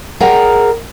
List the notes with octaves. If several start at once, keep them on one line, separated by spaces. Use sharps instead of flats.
G#4 A#4 D5 F#5 G5 A#5